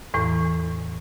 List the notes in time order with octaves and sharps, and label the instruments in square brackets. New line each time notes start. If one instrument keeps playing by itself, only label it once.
[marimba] E2 A2 E3